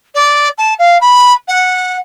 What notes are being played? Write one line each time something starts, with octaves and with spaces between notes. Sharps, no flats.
D5
A5
F5
B5
F#5